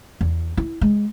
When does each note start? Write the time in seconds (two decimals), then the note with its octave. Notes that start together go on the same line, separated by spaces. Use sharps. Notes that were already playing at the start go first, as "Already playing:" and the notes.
0.21 E2
0.57 E4
0.81 G#3